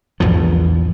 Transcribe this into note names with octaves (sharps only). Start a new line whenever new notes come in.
A#1 E2 G#2 F3